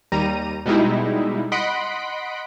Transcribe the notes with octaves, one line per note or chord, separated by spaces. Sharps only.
D#2 G3 A#5 D#7
B2 G3 G#3 D#4 E4
D#5 F#5 B5 C6 B6 D7